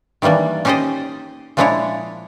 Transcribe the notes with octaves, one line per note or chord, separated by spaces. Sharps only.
D#3 E3 G3 A#3 D4
C#4 D#4 G4 C5 D5 D#5
A#2 F3 G#3 D4 E4 C#5